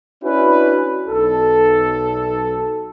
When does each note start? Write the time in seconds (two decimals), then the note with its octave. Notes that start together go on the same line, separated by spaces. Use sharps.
0.24 C#4 D4 E4 F#4 B4
1.09 B1 A4